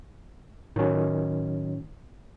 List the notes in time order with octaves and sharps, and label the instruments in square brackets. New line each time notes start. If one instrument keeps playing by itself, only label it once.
[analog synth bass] A2 [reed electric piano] D#3 F#3 C#4